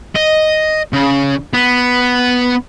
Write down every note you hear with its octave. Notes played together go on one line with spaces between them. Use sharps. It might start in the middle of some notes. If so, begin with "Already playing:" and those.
D#5
C#3
B3